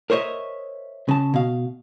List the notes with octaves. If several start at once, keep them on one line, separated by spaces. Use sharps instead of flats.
A#4 C5 C#5 D#5 E5
C#3 A5
B2 F5